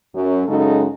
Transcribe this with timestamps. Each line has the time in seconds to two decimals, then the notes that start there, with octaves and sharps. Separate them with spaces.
0.15 F#2
0.48 F#2 C#3 G#3 D#4 F#4 A4